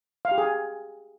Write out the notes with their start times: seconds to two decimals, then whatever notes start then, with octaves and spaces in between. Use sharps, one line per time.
0.25 F5
0.31 G4
0.38 G#4